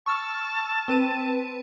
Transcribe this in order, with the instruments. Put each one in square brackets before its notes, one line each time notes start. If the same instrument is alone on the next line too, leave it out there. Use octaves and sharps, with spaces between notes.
[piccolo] A5 [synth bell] C#6 E6 F6
[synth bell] C4 B4 D#7